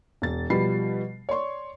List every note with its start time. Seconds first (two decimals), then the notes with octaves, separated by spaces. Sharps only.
0.22 E1 A6
0.50 B2 F3 G3 B5 C7
1.29 C#5 D5 C6 C#6